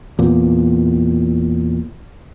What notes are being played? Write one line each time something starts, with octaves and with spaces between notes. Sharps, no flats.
E2 A#2